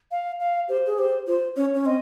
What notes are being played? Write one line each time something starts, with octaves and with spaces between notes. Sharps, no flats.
F5
F5
G4 C5
G#4
G4 C5
F4 C5
C#4 C#5
C#4
C4 D#5